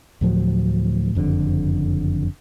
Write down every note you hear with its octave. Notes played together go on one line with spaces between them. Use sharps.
D2 A2 F3 F#3
F#1 F2 A2 D3